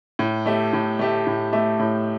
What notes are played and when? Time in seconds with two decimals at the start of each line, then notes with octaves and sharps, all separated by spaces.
0.19 A2
0.46 A3 G4 E5
0.73 A2
0.99 A3 G4 E5
1.27 A2
1.53 A3 G4 E5
1.79 A2